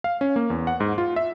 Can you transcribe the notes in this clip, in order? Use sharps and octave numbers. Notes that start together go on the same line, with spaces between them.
F5
C#4
A#3
E2
F#5
G#2
F4
E5